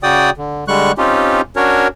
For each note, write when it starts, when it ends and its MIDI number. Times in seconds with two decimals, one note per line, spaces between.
0.03 0.30 49
0.03 0.30 66
0.03 0.30 74
0.03 0.30 79
0.03 0.30 87
0.38 0.64 50
0.68 0.92 50
0.68 0.92 55
0.68 0.92 56
0.68 0.92 85
0.68 0.92 90
0.98 1.41 60
0.98 1.41 61
0.98 1.41 63
0.98 1.41 65
0.98 1.41 67
1.56 1.88 61
1.56 1.88 62
1.56 1.88 66
1.56 1.88 70
1.56 1.88 73